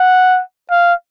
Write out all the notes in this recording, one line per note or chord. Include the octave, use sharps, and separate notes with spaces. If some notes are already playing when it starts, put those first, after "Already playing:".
Already playing: F#5
F5